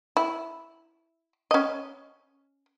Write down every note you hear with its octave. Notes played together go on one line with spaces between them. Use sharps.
E4
C#4 D#5